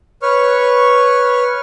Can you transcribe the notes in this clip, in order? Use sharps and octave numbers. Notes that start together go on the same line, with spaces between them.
B4 C#5 C#6 F6